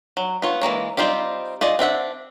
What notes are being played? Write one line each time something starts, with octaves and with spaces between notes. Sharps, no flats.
F#3
B3 F4 C#5
E3 G#3 A#3 C#5
G3 C4 D#4 F4 G4
F4 G#4 D5 D#5
C4 D4 E5 F#5